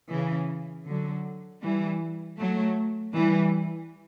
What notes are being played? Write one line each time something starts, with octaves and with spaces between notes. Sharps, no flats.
C#3 E3
D3 F#3
E3 G3
F#3 A3
E3 G3